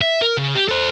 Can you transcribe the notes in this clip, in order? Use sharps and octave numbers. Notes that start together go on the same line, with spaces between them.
E5
A#4
C#3
G4
A4 C5